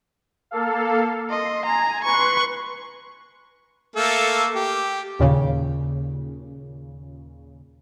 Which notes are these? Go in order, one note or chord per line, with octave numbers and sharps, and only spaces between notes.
A#3 A4 F5
D#5 C6
G#5 A#5
B4 C6 C#6 F#6
A3 A#3 A4
G4
D#2 A#2 C#3